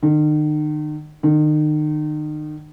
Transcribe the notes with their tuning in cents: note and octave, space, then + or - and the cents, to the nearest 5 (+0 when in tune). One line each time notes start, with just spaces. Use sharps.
D#3 -40
D#3 -35